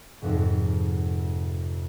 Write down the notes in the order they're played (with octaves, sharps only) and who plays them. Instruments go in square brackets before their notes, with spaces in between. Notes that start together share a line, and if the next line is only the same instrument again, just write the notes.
[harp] F1 F2 G#2